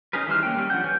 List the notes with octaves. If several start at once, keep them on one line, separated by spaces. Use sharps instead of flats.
C#4 D#4 G#4 A#4 B4
E3 G3 C5 F6
G#3 A#3 C#4 G5
G3 C#4
F3 D4 F#5 G6
G4 B4 C#5 G#5 G6